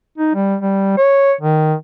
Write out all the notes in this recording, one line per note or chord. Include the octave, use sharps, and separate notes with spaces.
D#4
G3
G3
C#5
D#3